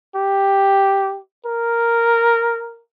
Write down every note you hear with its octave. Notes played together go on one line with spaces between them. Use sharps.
G4
A#4